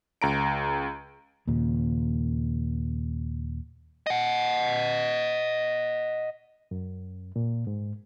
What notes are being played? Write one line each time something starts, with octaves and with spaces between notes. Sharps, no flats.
C#2 A#5 D7
D#2 A#2 C#3
D#5 F#5
F#2
A#2
G#2